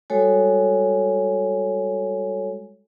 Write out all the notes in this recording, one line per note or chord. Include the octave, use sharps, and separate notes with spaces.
G3 G#3 F#4 A4 C#5 G#5